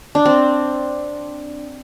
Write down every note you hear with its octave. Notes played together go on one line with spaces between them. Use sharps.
D4
C4